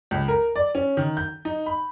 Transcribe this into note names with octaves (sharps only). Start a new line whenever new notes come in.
C#2
A#4
D5
C#4
D#3
G6
D#4
B5